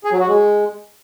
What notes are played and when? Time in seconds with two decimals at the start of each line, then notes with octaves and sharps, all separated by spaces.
0.04 G#4
0.12 F#3
0.20 F#4
0.28 G#3